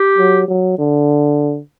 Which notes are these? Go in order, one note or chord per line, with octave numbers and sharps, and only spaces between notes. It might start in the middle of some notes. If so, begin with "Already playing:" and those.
Already playing: G4
F#3
F#3
D3